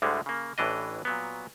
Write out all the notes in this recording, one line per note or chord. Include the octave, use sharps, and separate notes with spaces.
D2 A2 D3 G3 G#3
C#3 A#3
A1 A2 E3 D4 D#5
A#2 F#3 B3